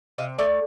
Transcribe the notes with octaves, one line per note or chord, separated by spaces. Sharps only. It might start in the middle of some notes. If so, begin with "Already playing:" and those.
C3 D#5 F5
A3 D5 E5